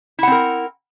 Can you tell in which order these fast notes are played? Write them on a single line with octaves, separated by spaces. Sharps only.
E4 F#5 C4 A#4